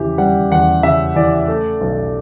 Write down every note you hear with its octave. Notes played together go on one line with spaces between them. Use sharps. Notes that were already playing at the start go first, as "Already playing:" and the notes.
Already playing: E2 C#3 E3 G4
G3 F#5
E2 F#5
C#3 E5
E3 D5
A3
B1